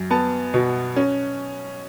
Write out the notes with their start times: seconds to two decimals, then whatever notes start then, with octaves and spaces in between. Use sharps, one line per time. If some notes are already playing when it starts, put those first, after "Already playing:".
Already playing: F#2
0.11 B3 A5
0.54 B2
0.96 C#4